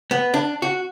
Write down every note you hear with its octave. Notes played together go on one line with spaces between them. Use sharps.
B3
D4
F#4